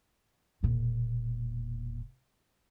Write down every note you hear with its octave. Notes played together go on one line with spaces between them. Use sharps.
E1 A#2